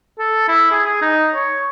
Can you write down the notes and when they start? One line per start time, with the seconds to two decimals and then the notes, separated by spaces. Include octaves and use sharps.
0.19 A4
0.48 E4
0.71 G#4
0.85 G#4
1.02 D#4
1.34 C#5